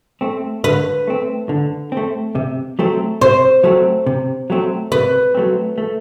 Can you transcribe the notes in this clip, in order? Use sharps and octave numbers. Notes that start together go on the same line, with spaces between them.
A3 C4
D3 B4
A3 C4
D3
A3 C4
C3
F#3 A3 C4
C3 C5
F#3 A3 C4
C3
F#3 A3 C4
C3 B4
F#3 A3 C4
A3